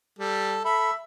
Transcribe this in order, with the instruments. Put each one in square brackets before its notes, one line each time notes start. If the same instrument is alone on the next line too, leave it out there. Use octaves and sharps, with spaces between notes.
[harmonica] G3 A4
[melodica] A4 B5 [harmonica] E5